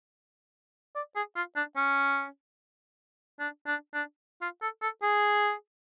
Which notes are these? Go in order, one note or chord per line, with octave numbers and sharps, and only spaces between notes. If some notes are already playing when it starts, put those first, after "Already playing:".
D5
G#4
F4
D4
C#4
D4
D4
D4
F4
A4
A4
G#4